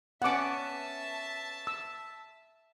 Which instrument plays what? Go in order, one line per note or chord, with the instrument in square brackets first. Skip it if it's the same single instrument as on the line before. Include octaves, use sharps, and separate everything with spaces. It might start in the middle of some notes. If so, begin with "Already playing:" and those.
[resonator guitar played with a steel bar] B3 C#4 [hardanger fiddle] E5 A5 [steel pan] F#5 D6
[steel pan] E6